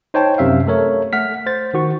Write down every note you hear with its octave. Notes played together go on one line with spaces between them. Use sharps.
D#4 C5 C#5 G5 A5
F#2 C3 E5 F5
A3 A4 A#4 C#5
A3 F#5 F6 B6
C5 A6
D#3 F#4 C#6